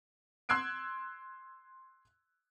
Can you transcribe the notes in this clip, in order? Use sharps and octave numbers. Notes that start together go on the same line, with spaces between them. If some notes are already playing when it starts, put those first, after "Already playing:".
C6 E6 F#6 G#6 C7 D7